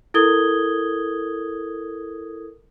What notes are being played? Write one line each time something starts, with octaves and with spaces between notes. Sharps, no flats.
E4 A4 A#4 D#6 G#6 G7